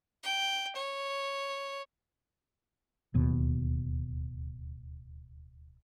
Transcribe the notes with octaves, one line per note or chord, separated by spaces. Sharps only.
G5
C#5
D1 D#2 B2